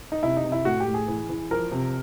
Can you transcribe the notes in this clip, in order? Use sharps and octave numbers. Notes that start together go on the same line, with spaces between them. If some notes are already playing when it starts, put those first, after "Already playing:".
D#4
C3 E4
D#4
C3
E4
A2 F#4
G4
A2
G#4
E3
E3
F3 A#4
C3